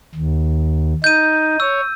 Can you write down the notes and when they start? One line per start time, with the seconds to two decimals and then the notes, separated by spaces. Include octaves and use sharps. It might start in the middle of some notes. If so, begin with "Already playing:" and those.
0.15 D#2
1.04 D#4 G6 D#7
1.60 C#5 E6